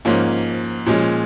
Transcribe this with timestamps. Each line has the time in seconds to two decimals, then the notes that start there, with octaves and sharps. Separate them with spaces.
0.05 G#2 F3 A#3 C#4
0.86 A#2 F3 G#3 C#4